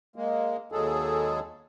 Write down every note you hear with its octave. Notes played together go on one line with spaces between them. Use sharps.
G#3 A#3
D#2 F#3 G#3 G#4 A4